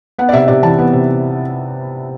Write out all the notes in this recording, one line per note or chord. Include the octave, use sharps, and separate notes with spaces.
B3 F#5
D5
C3 E5
C3 D5
E3 A5
B3
C3